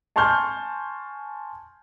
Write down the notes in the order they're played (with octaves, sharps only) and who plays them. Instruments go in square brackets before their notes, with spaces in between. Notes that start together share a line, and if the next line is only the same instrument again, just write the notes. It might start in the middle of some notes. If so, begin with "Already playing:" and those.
[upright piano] G#5 A5 C6 C#6 F6 G6